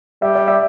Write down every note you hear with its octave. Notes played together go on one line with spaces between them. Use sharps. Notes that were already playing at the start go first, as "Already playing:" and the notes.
G3 E5
D5
E5